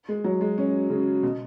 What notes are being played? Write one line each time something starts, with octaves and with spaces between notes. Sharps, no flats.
G#3
F#3
G#3
C#4
C#3
B2